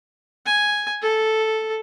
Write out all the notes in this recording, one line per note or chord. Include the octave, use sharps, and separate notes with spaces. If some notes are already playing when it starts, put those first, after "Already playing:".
G#5
A4